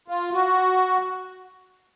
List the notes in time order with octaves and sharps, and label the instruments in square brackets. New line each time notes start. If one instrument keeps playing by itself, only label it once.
[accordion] F4
F#4